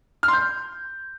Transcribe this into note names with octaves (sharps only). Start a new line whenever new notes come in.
F6
C6
G6